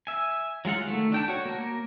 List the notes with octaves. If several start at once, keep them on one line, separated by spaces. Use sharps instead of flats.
E5 G#5
F#3 G#3 F4 F#5
D#3 A3
D4 G5 A5
F#4 C#5
A#3 A#4